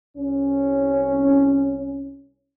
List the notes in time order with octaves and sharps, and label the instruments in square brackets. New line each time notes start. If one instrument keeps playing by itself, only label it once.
[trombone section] C2 C#4